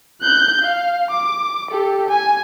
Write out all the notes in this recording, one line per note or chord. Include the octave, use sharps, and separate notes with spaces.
F#6 G6
F5
D6
G4 A4
G#5